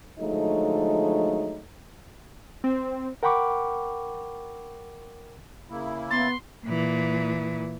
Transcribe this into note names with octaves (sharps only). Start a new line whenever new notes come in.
D3 F3 F#3 G#3 A3 D#4
C4
A#4 F#5 G5 B5 C#6 D6
C#3 A#3 E4
B3 C6 A6
A#2 E3